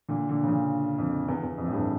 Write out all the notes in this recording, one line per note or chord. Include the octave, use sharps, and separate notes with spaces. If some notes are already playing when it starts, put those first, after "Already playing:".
A#2 D3
A#2 D3
C#3
A#2 D3
F2
E2
E2
F2
A2
E2 G2